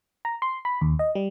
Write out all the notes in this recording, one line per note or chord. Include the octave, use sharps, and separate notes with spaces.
A#5
C6
B5
D#2
D#5
G3